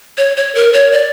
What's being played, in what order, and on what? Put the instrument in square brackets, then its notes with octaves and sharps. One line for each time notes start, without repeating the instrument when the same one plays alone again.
[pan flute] C#5
C#5
A#4
C#5
D5